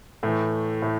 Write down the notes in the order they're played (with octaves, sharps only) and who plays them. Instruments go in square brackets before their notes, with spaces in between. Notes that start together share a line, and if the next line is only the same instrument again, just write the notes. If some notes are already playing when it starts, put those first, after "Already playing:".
[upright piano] A2 E3 A3
A2 A3